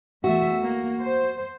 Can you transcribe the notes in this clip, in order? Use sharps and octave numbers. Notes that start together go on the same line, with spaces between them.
E2 A3 F#4 E5
A#3
C5